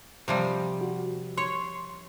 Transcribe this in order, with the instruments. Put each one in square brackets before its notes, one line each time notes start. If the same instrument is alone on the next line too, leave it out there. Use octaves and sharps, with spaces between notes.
[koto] C3 F3 G3
[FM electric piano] F#4
[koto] C#5 [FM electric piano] C6